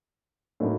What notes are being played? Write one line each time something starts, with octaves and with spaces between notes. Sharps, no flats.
A2 F#3 A#3 D#4